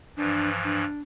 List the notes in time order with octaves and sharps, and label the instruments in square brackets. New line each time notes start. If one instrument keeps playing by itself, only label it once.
[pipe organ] G2 E3 F3 [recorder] D4
[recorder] D4